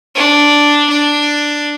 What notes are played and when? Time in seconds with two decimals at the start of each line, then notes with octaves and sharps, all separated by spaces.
0.15 D4
0.89 D4